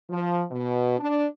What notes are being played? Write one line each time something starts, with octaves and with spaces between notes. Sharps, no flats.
F3
B2
D4